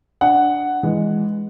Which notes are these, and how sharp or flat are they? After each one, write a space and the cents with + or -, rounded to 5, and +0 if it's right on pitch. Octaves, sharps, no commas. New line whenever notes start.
D4 +0 F#5 +0
E3 +0 G#3 +0